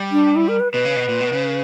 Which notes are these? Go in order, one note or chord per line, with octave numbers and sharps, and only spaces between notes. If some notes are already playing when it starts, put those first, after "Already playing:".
Already playing: G3
D4
E4
A#4
B4
B2 B4
C#3
B2
A#2
B2
C#3